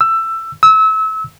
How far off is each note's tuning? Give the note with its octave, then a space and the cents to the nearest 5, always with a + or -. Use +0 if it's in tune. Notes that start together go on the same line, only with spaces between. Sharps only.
E6 +15
E6 -30